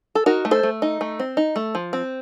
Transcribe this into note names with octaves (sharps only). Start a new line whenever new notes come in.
A4
D#4 F#4 A#4
A3
A4 C5
A3
D#4
A3
C4
D#4
A3
F3
C4